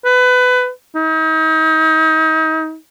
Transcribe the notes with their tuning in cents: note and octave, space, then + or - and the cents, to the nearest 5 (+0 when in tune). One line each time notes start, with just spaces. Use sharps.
B4 +20
D#4 +35